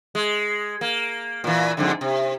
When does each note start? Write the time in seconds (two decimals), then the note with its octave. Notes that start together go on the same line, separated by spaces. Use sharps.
0.15 G#3
0.81 A#3
1.44 A#2 E3
1.77 F2 G#2 D3
2.01 C3